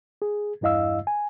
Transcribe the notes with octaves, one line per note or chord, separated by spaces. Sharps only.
G#4
E2 G2 E4 D#5 F5 E6
G#5